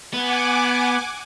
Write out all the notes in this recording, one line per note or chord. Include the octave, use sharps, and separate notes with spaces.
B3 F#5 G#5 D6